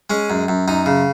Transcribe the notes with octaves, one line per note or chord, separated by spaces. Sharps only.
G#3 C#4
F#2
F#2
F#2 D#4
C#3